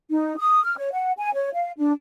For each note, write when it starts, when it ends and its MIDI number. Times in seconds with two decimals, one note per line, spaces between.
0.10 0.37 63
0.37 0.63 87
0.64 0.76 89
0.77 0.91 73
0.92 1.12 78
1.17 1.33 80
1.34 1.50 73
1.54 1.70 77
1.78 1.92 62